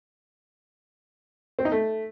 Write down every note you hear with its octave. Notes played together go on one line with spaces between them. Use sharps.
C4
D#4
A3